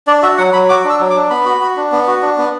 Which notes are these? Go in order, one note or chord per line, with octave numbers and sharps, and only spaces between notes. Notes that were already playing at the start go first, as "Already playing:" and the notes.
D4 D5
F#4 E5
F#3 F#5
F#3 B5
F#4 D6
D4
E6
F#3
D6
D4
B3 B5
F#4
F#4
D4
B3
F#4
D4
B3